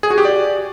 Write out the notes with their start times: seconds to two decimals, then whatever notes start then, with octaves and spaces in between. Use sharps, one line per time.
0.03 G#4
0.10 F#4
0.18 G4
0.25 D5